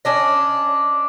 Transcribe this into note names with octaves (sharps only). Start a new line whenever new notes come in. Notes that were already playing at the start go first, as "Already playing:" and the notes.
C#4 D4 D#5